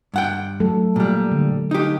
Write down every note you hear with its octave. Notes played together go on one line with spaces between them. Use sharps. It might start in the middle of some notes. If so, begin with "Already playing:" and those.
G2 F#5 G5
F#3 A3 A4
A#2 G3
D3
D#4 G4